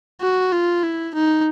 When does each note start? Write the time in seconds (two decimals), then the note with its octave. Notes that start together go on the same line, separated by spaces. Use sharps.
0.21 F#4
0.52 F4
0.83 E4
1.15 D#4